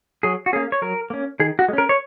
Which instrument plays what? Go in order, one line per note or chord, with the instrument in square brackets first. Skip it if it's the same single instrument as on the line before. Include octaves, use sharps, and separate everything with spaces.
[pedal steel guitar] F#3 G#4
F#4
A#3 C#4 G#4
C#5
F#3 A#4
A#3 C#4
D#3 G#4
F#4
G#3
C#4 A#4
C#5